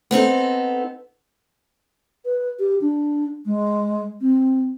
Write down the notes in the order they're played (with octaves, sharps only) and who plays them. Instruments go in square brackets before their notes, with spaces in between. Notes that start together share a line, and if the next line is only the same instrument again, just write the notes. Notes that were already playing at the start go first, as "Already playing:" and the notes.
[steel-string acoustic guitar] B3 C4 D#4 A4
[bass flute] B4
G4
D4
G#3
C4